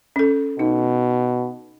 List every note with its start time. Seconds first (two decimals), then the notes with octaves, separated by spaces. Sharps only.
0.16 C#4 A4
0.59 B2 D#4